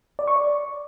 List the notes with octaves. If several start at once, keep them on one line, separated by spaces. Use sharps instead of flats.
D5
C#6
D5